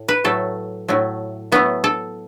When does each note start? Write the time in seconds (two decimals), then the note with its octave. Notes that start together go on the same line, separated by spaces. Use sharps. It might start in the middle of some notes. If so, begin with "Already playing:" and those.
Already playing: A2
0.08 B4
0.24 A2 F#3 A3 A4
0.88 A2 F#3 A3
1.52 A2 F#3 A3 B3
1.84 A4